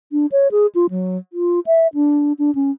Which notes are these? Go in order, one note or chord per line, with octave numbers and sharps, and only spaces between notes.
D4
C#5
G#4
F4
F#3
F4
E5
D4
D4
C#4